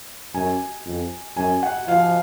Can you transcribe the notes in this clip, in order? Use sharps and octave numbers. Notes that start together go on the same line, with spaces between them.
F#2 G#5
F2
F#2 G#5
F#5
F3 F5